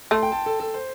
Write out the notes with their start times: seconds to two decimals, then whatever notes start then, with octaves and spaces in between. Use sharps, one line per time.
0.11 A3 C6
0.23 G5
0.32 A5
0.46 A4
0.60 A4
0.74 C5